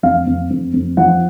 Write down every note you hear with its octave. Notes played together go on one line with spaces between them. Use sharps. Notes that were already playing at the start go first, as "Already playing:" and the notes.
F2 F5
F2
F2
F2
F3 F#5